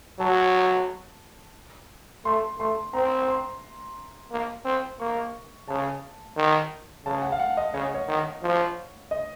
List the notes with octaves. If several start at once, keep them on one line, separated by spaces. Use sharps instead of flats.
F#3 A5
A3 C6
A3 C6
C4 A#5
C6
A#3
C4
A#3 C#6
C#3 A5
D#3
C#3 A5
F#5
F5
F#5
D#5
C#3 C#5
C#5
D#3
F3
D#5